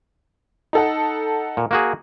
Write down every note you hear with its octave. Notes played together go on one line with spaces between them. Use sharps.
D#4 A4 F#5
A#2
A#3 F#4 G#4